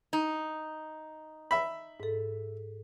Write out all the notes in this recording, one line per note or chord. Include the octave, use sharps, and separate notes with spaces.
D#4
E5 B5
G#2 A4